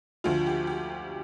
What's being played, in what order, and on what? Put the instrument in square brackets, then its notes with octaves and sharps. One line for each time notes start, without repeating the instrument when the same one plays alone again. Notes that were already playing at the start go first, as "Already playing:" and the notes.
[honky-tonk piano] D2 D3 F3 F4
G4
G4